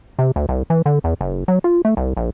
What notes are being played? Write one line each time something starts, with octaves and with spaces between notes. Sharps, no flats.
C3
D2
C2
E3
D3
E2
F#1
F#3
F4
A3
C2
A#1